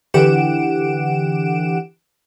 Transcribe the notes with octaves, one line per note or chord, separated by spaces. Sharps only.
D3 E3 G4 F#5 D7 E7